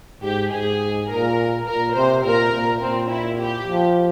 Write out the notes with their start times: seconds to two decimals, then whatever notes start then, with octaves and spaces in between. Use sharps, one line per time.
0.23 G#2 G4
0.52 G#2 G#4
1.09 A#2 A#4
1.67 A#2 A#4
1.95 C3 C5
2.24 A#2 A#4
2.53 A#2
2.82 A#2 C4
3.10 E4
3.40 G4
3.67 F3